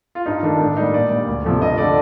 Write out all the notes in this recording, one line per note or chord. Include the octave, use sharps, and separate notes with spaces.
F4
G2 D#4
D#3 A3 D4
A2 D4
G3 A#3 D#4
A#2 D5
G3 A#3
D2
C3 F3 A3
G2 D#5
D3 A3 D5